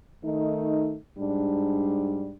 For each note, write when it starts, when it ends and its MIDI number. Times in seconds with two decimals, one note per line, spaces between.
0.23 0.96 51
0.23 0.96 57
0.23 0.96 63
1.18 2.34 44
1.18 2.34 55
1.18 2.34 62